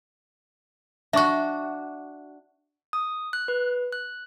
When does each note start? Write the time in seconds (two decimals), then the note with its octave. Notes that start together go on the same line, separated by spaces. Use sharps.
1.13 D4 F#4 E5 C#6
2.93 D#6
3.33 F#6
3.48 B4
3.93 F#6